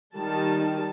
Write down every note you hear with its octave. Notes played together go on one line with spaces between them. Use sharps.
D#3 G3 A5